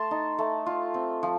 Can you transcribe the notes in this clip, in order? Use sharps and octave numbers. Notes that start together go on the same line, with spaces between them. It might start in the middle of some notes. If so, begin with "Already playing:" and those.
Already playing: A3 A5 C6
D#4
A3
F4
C4
F3